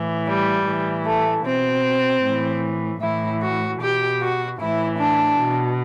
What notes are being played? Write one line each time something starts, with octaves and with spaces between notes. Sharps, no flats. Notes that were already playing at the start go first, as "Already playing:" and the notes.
Already playing: A2 E3
G3
A2 E3
A3
B2 C4
A2 E3
A2 E3 E4
F#4
B2 G4
F#4
A2 E3 E4
D4
B2